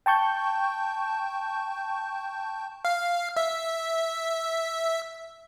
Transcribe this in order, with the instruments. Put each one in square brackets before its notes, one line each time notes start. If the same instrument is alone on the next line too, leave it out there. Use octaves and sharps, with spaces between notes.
[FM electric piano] G5 A5 C#6 G6
[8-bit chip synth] F5
E5